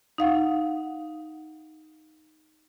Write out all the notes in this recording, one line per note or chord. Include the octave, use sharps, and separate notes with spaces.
D#4 F5 F#5